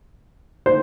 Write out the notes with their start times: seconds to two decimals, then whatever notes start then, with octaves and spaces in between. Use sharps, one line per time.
0.66 C5